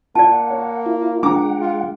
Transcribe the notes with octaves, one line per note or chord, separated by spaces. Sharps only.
A#3 F4 D5 F#5 A5
C#5
E4 F4
F3 G#3 D4 F#5 G5 A#5 D6
F4